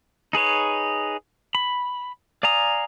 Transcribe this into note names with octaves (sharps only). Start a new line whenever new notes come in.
D#4 G#4 B4 C#5
B5
D5 F5 G#5 A#5 D#6